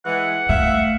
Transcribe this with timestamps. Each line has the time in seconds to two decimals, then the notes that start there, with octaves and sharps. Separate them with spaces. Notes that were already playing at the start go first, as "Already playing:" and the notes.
0.06 E3 G#3 F#5
0.49 A3 E5 F5